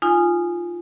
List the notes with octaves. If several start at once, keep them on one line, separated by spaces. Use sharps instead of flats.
D#4 F4 G#5